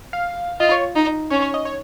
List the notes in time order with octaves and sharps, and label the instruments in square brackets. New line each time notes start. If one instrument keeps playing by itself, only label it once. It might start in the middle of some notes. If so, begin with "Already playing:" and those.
[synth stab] F5
[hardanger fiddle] F4 [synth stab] D#5
[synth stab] C#5
[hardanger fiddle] D#4
[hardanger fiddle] C#4 [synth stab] C#5
[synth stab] C#5
D#5
C#5